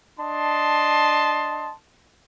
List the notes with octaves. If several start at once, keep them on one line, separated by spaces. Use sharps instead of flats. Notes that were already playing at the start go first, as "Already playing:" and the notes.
D4 D#5 A5 C6